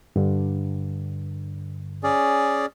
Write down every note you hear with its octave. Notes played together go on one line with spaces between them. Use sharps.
G2 D3
C#4 G#4 D5